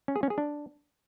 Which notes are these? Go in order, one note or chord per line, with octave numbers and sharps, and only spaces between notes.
C#4
G#4
C#4
G#4
D4